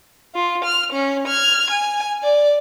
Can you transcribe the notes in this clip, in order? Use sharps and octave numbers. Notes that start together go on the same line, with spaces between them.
F4
F6
C#4
F6 G#6
G#5
D5